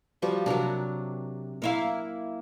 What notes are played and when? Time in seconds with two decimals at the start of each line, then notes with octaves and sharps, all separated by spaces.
0.22 F3 G3 F#4
0.46 C3 F#3 D4 A#4
1.62 A#3 E4 F5